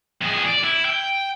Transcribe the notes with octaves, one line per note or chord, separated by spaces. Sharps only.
F2 G#4
D5
E4
G5